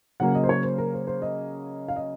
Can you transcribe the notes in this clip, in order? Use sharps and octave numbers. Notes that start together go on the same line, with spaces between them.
C#3 F#3 A#3 C#4 F#5
D#5
C5
C#5
C5
A#4
C5
C5
D#5
F5
D#5